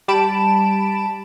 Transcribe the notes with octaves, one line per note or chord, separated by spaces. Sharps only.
G3 G4 A5 B5 D7 E7